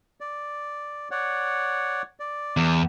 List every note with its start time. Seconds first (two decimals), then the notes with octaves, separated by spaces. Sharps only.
0.21 D5
1.11 C#5 D5 F#5
2.20 D5
2.57 E2